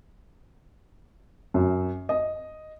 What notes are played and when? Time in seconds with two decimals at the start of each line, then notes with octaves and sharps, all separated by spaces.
1.54 F#2
2.09 D#5